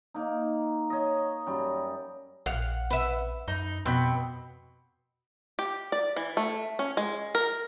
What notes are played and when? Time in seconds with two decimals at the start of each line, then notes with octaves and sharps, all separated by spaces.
0.14 A#3 D#4
0.90 C#5 D#5
1.47 F#2 G3
2.46 A#1 F5 F#5
2.90 B4 E5
3.48 F#2 D#4
3.86 F2 B2 B3 C4
5.59 G4
5.92 D5
6.16 E3
6.37 A3
6.79 C#4
6.97 G#3
7.35 A#4